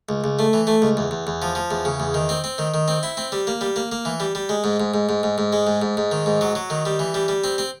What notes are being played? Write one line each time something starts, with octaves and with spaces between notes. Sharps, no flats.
C#2
C#2
A3
E3
A3
C#2
E2
E2
E2
F3
F3
E2
C#3
E2
D#3
C4
C4
D#3
D#3
C4
E4
C4
G3
A#3
G3
A#3
A#3
E3
G3
G3
G#3
G#2
G#2
G#2
G#2
G#2
G#2
G#3
G#2
G#2
G#2
D#3
G#2
F#3
F#3
D#3
G3
E3
G3
G3
C4
C4